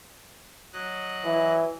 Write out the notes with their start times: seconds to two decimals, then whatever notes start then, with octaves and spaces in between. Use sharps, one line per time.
0.73 F#3 D#5 F#6
1.25 E3